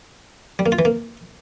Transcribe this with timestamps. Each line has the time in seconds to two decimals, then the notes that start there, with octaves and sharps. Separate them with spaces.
0.59 G3
0.66 A#3
0.72 F4
0.79 E3
0.85 A#3